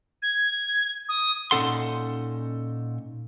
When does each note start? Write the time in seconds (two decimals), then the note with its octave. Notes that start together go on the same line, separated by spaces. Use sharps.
0.22 G#6
1.08 D#6
1.51 A#2 C#4 D#4 A4 F#5 C6